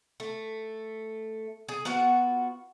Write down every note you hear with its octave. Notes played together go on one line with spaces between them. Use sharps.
A3
G#4
B3 F4 F#4 F#5